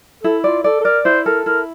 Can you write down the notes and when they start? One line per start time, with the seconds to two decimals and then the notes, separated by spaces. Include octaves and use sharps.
0.23 E4 A4
0.44 F4 D5
0.64 A4 D5
0.81 A4
0.85 A#4 D5
1.05 E4 C5
1.26 A4 A#4
1.46 E4 A#4